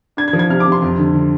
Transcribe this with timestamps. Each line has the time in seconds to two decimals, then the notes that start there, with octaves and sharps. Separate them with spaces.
0.17 D4 G#6
0.28 G#6
0.33 F3
0.39 G#6
0.49 C3 F6
0.60 D6
0.67 C3
0.72 C6
0.82 F2
0.98 D3
1.14 D3